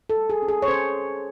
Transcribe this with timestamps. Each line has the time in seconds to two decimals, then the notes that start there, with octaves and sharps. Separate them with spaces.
0.10 A4
0.16 G3
0.30 G#4
0.42 C#4
0.48 G#4
0.62 C#5
0.68 C#4 C5